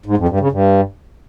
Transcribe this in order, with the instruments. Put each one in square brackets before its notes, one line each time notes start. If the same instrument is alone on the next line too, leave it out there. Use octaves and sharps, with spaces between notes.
[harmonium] G#2
F2
G2
C#3
G2